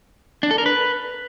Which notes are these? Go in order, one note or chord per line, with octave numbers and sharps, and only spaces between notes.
D4
A4
A#4
B4